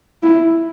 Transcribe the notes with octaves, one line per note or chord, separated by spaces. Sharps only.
E4